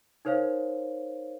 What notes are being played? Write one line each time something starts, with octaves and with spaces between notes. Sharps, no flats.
D#4 A#4 C5 C#5 F5